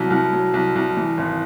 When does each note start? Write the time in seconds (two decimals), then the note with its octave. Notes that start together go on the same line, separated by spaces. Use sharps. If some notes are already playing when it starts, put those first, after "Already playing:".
Already playing: C2 F#3
0.10 C2
0.33 F#3
0.54 C2
0.76 C2
0.97 E3
1.17 G#1